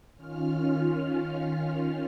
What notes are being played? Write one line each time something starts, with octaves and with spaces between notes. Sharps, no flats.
D#3 C#4 F4 F6